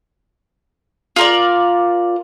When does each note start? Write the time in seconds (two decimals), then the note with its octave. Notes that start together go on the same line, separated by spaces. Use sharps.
1.16 F4 A#4 D5